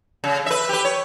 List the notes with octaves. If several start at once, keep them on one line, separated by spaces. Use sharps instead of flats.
C#3
B4 E5
G4 B4
C#5